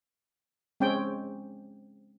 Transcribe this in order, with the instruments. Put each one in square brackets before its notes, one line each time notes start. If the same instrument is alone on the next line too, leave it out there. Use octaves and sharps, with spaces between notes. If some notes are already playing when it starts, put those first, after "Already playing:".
[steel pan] G#3 C4 C#4 G5